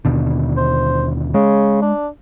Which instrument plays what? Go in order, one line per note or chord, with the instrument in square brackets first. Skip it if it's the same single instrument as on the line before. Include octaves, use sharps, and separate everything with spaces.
[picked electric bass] D#2 B2 D3
[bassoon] C5
[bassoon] C#3 [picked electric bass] G#3
[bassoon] D4